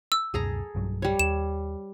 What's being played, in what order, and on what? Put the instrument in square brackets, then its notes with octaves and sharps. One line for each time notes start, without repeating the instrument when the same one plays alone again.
[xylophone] E6
[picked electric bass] C#2 F#2 B2 [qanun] G#4 A4 A#5
[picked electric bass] B1 G2 F#3
[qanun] G3 C#5
[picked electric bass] D#2 [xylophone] E7